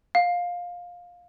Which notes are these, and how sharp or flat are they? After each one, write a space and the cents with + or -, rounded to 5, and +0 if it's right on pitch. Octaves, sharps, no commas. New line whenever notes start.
F5 +15